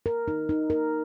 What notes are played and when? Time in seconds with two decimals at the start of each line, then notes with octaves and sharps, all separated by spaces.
0.06 A#4
0.28 D#4
0.49 D#4
0.70 A#4